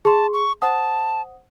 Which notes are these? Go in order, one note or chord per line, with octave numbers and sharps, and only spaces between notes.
G#4 A5 C6
C#6
C5 F#5 A5 D#6